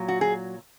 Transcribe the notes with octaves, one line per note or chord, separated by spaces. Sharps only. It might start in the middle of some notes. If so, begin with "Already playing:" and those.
Already playing: A#2 F#3
F#4
G#4